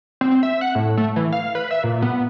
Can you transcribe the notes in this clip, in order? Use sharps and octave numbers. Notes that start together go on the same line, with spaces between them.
C4
E5
F#5
A2
A3
E3
F5
B4
E5
A#2
B3